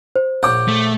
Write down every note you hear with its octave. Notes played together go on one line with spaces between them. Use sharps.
C5
A#1 C#5 F#5 D6 G6
A3